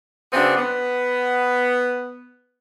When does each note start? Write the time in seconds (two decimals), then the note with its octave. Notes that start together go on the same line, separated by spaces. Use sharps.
0.33 C#3 F#3 B3 C4 D4
0.56 B3